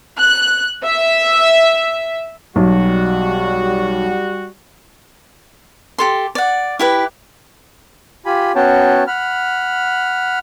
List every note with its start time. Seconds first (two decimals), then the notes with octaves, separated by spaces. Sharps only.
0.18 F#6
0.84 E5
2.56 B1 G3 F#4
5.98 G4 A4 C6
6.35 D5 F#5
6.79 E4 G4 B4
8.26 F4 G4 G#5 B5
8.55 B3 C#4 F#4 C#5 G5 A5
9.07 F#5 B5 F6